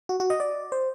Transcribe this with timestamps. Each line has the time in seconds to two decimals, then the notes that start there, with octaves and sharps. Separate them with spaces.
0.09 F#4
0.20 F#4
0.30 D#5
0.40 D5
0.72 C5